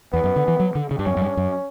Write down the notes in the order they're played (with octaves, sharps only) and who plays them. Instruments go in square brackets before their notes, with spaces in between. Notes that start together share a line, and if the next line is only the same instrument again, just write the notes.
[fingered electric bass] E2 [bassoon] B3
[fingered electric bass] F#2
D3
E3
F#3
D3
C#3
G2
[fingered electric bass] F#2 [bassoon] C#4
[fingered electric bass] F#2
G2
F#2